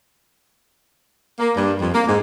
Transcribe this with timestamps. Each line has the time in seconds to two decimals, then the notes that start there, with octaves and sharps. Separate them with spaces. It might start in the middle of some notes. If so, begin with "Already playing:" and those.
1.39 A#3
1.57 G2
1.80 F2
1.94 A#3
2.07 G#2